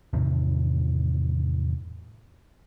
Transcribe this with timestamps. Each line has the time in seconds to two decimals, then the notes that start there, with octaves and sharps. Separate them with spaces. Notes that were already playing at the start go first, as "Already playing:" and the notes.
0.13 E2 A2 C3 D#3